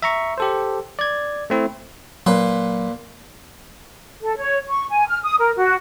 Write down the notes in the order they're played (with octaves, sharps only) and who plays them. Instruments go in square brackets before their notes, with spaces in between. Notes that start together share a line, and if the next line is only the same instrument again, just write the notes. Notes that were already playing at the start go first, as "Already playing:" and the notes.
[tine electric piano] E5 A#5 C#6
G4 A4 C5
D5 G#6
A3 C4 E4
[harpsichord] A#2 B4 C6 [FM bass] F#3
[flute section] A4
C#5
C#6
G#5
F6
D#6
A#4
F#4